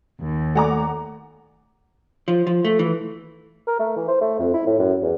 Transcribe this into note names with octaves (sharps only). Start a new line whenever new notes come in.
D#2
A3 D5 F#5 G#5 A#5 D6
F3
F3
A3
E3
A#4
A3
E3
C5
A3
F2
E4
A2
F#2
E2